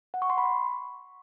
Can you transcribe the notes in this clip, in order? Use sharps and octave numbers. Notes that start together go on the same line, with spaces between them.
F#5
C#6
C6
B5
C#6